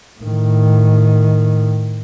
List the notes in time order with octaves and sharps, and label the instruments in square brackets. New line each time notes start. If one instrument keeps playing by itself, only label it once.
[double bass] A2 D#3